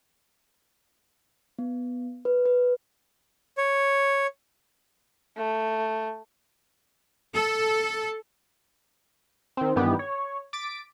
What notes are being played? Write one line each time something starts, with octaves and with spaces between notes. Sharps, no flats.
B3
B4
B4
C#5
A3
A4
D#3 C4
G2 D#3 E3 B3 G4
C#5
D6 A6 B6 D7